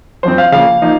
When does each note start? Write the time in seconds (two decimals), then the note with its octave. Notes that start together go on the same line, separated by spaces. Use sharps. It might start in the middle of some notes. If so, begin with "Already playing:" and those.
0.23 F#2 F3 C4 C5
0.38 F5
0.52 C#3 F3 A#3 F5
0.82 F3 A#3 D#4